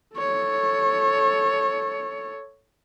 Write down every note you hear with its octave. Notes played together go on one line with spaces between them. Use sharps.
A4 C#5